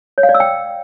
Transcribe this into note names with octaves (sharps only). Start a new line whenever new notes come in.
C#5
F5
D5
E6
G5